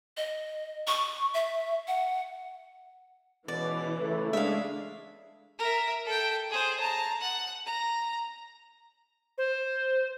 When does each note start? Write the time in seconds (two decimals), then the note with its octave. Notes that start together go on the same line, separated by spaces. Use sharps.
0.17 D#5
0.87 C#6
1.34 E5
1.88 F#5
3.48 B2 E3 G#3 C#4 D5
3.99 C#3 A3
4.33 G#3 D4 G#4 E5 F5
5.59 A#4 E5
6.06 A4 G5
6.50 G#4 C5
6.80 A5 A#5
7.21 F#5
7.66 A#5
9.38 C5